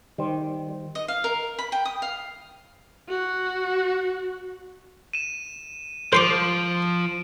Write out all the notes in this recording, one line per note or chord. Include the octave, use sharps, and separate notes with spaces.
D#3 G3 C5
D#5
F5
A#4
B5
G5
D#6
F5
F#4
D#7 E7
F3 C5 C6 D6 D7 D#7